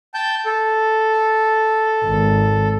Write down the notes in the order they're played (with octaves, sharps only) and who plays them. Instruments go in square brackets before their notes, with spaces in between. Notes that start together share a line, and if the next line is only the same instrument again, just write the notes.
[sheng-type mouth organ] G5 A5 G6
A4
[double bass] G#1